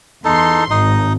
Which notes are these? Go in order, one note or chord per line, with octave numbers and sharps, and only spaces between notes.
E2 D#4 A4 C6
G#1 D#4 D#5